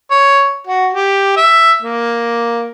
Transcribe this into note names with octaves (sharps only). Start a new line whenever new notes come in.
C#5
F#4
G4
E5
A#3